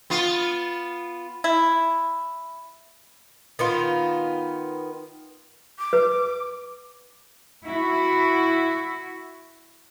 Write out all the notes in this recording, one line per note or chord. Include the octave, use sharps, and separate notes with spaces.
B3 F4
E4
D#3 B3 F4
D6
B4
E4 F#4